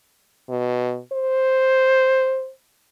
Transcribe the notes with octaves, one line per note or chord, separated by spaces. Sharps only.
B2
C5